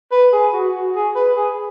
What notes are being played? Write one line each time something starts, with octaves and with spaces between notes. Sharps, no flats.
B4
G#4
F#4
F#4
G#4
B4
G#4